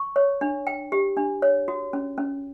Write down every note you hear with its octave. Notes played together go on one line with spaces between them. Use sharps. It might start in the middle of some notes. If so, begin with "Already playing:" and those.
Already playing: C#6
C#5
D4
G5
G4
D4
C#5
F#4
C#4
C#4